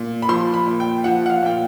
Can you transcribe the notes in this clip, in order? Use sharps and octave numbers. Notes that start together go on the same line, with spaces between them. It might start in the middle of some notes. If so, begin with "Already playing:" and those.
Already playing: A#2
B5
F3 C6
B5
A#2
G5
F3 F#5
F#5
F5
A#2 G5